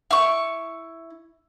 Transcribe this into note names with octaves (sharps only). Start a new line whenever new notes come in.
E4 C#6